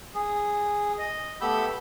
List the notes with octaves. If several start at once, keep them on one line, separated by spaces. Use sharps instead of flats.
G#4
D#5
A3 B3 G4 B5 E6 G6